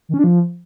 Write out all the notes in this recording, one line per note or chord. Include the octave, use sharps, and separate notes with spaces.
D#3
C#4
D4
F3